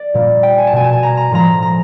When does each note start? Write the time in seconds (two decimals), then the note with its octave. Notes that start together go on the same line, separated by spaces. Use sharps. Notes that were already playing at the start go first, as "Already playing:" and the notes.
Already playing: D5
0.14 A#2 G3 A#3
0.43 G5
0.58 G#5
0.67 A5
0.73 B2 G#3 G#5
0.84 A5
0.93 G#5
1.03 A#5
1.17 A#5
1.31 A2 F3 G#3 A#5
1.62 A#5